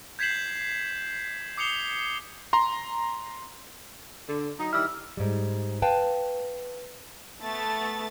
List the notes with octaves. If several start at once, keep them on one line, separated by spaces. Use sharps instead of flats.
G6 G#6 B6 C7 E7 F#7
D6 D#6 C7 C#7 F7 G7
A#5 C6
D3
F#3 D#4
D#3 G3 E4 E6 F6
G#2 G3
B4 F5 G5 A5
A3 B3 A6